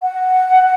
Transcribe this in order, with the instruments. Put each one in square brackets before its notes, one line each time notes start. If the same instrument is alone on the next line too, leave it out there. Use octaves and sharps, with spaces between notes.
[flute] F#5